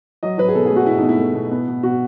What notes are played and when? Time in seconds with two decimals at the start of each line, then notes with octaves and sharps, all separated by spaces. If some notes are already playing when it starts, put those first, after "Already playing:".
0.23 F#3 D#5
0.38 F#3 B4
0.48 G#4
0.55 B2 A4
0.66 A3 G#4
0.76 F#4
0.86 B2 E4
0.98 B2 D#4
1.09 E4
1.18 A3
1.35 B2
1.51 B3
1.68 B2
1.83 B2 F#4